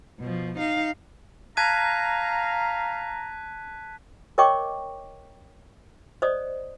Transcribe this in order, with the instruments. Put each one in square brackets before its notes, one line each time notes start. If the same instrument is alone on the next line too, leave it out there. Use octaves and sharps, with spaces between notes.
[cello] B2 F3
D#4 F5
[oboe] F5 [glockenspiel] A5 G#6 D#7 [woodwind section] A#5 [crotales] F#6 B6
[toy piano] A#4 C#5 D#5 G5 C#6 D6
C5 D5 D#5 D#6